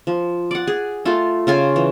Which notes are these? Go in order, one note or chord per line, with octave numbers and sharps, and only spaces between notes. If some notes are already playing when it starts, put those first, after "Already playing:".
F3
D5 F#5
G#4
A3 F4
C#3 F4 G#5
E3